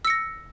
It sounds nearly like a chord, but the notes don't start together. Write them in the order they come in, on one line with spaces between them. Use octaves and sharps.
E6 C#7 A#6